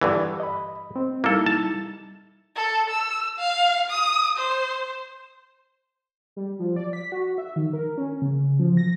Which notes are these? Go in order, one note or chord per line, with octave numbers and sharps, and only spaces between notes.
G2 D3 E3
D#5 B5
C4
G3 A#3 D#4 E4 A4
A5
A4
E6
F5
D#6
C5
G3
F3
D5
B6
F#4
E5
D#3
A#4
C#4
C#3
F3
A#6